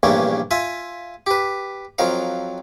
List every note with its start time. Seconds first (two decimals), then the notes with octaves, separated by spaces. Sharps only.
0.03 A#1 E2 G2 A3 A#3 C#4
0.51 F4 E5 G#5
1.27 G4 B4
1.98 F2 F3 F#3 A#4 F5